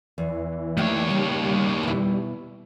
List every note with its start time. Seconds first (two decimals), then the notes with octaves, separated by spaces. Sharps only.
0.18 E2 E3
0.77 D#2 A3 C#5 D5 G5
1.10 C#3 G3
1.83 B2 E4